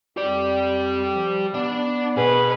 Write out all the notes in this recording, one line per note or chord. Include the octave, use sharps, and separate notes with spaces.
F2 G4 D5
F3
B3 D4 D5
B2 G#4 B4